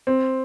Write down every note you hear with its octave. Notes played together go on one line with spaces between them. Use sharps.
C4